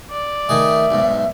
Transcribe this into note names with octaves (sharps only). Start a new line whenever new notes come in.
D5
D#3 A3 G#4 E5
B1 G#2